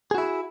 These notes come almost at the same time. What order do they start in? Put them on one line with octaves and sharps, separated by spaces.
G#4 F#4 E4